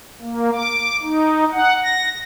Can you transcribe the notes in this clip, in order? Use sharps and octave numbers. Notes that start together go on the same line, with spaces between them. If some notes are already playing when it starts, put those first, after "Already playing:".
A#3
D6
D#4
F#5
A#6